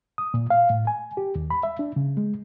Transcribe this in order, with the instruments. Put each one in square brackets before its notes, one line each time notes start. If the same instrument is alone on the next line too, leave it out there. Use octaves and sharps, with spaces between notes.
[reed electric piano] D#6
A#2
F5
A2
G#5
G4
D#2
B5
E5
D4
C#3
G#3